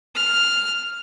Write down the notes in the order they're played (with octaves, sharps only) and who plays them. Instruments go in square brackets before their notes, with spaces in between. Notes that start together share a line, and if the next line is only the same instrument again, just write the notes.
[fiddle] F6